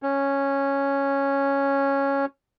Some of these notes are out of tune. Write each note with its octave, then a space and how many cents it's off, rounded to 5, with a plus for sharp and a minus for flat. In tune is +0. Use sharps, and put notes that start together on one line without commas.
C#4 -5